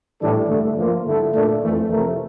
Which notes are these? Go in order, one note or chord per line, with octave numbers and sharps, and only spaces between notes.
A2 E3 G3 D4 A4
G2 D3 A3
F3 A#3 F4
G2 D3 A3 E4 A4
A#2 A3 D4
F2 E3 A3
C3 F3 A3 E4 A#4